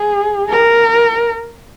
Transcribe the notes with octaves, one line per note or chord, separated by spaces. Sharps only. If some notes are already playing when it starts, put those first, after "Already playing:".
Already playing: G#4
A#4